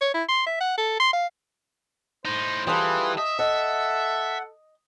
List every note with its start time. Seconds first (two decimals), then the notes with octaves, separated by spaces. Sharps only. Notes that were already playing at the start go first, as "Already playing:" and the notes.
0.01 C#5
0.14 E4
0.29 C6
0.47 E5
0.61 F#5
0.78 A4
1.00 C6
1.13 F5
2.25 A2 D#4 C5
2.67 E3 G3 F4 G#4 A4 B4
3.17 D#5 E5
3.39 A4 D#5 F#5